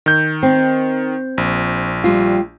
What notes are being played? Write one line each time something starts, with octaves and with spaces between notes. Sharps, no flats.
D#3 G6
C4
A#1
G3 F4